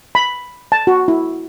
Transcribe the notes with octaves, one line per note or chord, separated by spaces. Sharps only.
B5
A5
F#4
E4